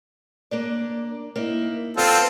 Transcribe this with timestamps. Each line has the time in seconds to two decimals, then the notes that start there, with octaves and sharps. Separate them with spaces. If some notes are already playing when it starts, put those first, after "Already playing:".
0.51 A#3 D4 D5
1.36 A#3 D#4 E4
1.97 G3 B3 C4 F4 A4